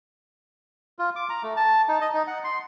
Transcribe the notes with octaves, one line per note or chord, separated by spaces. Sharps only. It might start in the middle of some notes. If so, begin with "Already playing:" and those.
F4
D6
A#5
A3
A5
D#4
D#5
D#4
F#5
C6